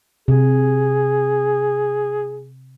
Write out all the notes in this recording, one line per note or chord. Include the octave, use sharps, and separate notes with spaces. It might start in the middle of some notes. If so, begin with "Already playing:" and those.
C3 G#4